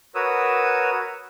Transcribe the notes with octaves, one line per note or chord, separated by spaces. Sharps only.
F#4 A#4 B4 C#5 D#6 E6